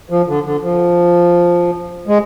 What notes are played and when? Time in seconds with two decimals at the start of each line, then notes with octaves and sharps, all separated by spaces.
0.10 F3
0.27 D3
0.45 D3
0.61 F3
2.07 G#3